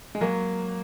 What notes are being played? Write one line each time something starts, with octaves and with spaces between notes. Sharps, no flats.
G#3
F#3 A#3